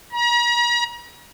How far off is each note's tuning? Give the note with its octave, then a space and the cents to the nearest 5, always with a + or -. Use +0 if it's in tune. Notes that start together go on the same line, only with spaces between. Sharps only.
A#5 +40